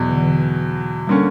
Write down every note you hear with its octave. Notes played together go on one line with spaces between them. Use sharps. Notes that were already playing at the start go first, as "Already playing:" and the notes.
Already playing: E2 B2 F#3
D3
E3
D3
D3 G3 A#3 C#4